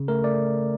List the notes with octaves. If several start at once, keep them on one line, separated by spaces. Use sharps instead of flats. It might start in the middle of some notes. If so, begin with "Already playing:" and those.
Already playing: C#3
A3 A#4
A3 D5